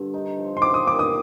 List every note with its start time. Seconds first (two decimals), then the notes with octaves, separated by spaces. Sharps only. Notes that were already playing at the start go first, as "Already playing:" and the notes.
Already playing: G2 D3
0.14 D#4
0.38 F3
0.57 C6
0.62 C4 D6
0.74 D#6
0.86 A#2 D6
0.99 D#6